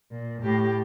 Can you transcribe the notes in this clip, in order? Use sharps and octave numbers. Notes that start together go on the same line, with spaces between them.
A#2
A2 G4